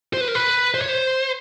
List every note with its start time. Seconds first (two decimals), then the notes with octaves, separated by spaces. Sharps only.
0.13 C5
0.21 B4
0.28 A#4
0.35 B4
0.74 C5
0.81 C#5
0.89 C5